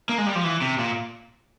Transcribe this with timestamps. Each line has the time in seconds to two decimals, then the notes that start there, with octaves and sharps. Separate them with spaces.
0.09 A#3
0.18 G#3
0.27 G3
0.35 F3
0.44 E3
0.61 C3
0.79 A#2